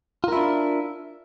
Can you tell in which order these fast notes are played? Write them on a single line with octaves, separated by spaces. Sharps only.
F4 A#4 E4 D4